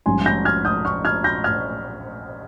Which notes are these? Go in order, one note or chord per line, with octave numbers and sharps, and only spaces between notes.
A#1 G#2 G3 C#4 G#5 C6
G6 A#6
F6 G#6
D#6 G6
C#6 F6
F6 G#6
G6 A#6
F6 G#6